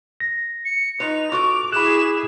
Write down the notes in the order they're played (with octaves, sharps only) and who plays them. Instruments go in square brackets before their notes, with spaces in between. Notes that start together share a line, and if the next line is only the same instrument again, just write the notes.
[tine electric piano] A#6
[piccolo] C#7
[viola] D#4 [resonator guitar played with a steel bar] F4 B4 [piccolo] F7
[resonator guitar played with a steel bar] F4 F#4 A4 [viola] D6
[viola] E4 G#4 [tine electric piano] B5 D6 F#6 [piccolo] E7